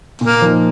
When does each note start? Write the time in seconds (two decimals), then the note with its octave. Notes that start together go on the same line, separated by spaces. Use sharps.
0.21 A#2 A#3
0.42 F3 D#4